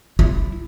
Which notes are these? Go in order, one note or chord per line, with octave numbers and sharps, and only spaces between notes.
E4